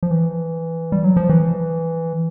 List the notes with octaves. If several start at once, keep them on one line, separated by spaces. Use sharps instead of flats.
F3
E3
G3
F#3
F3
E3